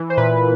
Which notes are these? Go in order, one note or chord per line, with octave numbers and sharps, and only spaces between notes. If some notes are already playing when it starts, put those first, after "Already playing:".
Already playing: E3
C5
A#2 B4